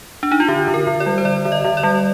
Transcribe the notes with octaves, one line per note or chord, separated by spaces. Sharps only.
D4
D#4
F4
D3 G4
D3
A#4
D3
D5
G3
C5
D3 D5
D3
D#5
D3
D5
G3